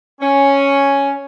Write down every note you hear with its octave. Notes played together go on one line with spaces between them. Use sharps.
C#4